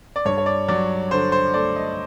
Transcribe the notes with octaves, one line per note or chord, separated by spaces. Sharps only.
D5
G2 C#5
C#5
D5
F#3 D5
D3 C5
C5
A3 D5
D#5